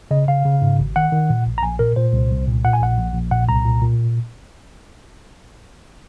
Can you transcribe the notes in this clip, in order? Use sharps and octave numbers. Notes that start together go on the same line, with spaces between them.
C#3 D#5
C#3 F5
C#3
G#2
G#1
D#3 F#5
D#3
A#2
A#1
A#5
A#1 G#5
A#2 A#4
A#2 C5
C2
C2
A#2
A#2 F#5
G#5
A#1 F#5
A#1
A#1
A#2 F#5
C2 A#5
A#2
A#2